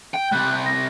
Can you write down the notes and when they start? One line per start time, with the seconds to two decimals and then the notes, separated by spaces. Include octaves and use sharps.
0.14 G5
0.32 C3 G3 F#6
0.66 A#6